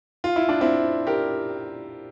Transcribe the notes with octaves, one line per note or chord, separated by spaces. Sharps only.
F4
E4
D4
C4 E4
G4 A#4